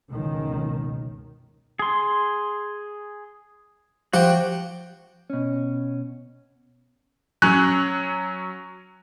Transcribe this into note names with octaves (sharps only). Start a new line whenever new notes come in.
F#1 C#2 B2 D#3
G#4 C6
F3 F#4 G4 F#5 G5
B2 C#4
F#3 C#4 F#6